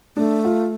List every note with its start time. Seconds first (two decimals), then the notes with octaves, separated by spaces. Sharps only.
0.16 A3 D4
0.45 F4